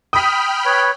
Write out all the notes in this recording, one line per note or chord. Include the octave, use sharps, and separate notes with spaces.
G5 B5 D#6 F6 B6
B4 C#5